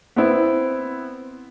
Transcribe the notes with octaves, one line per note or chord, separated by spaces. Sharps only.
B3 C4 E4